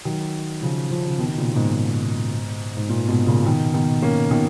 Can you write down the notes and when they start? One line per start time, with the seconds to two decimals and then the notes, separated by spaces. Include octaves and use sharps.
0.05 D#3 F#3
0.62 C#3 F3
0.90 C#3 F3
1.07 C#3
1.19 B2 D#3
1.30 B2
1.37 A#2 C#3
1.52 A#2
1.56 G#2 B2
2.77 G#2
2.89 A#2
3.08 G#2 B2
3.27 A#2 C#3
3.46 B2 D#3
3.74 B2 D#3
4.02 A#3 C#4
4.31 B2 D#3